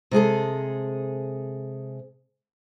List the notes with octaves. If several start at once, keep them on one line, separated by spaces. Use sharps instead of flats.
C3 G#3 G#4 A4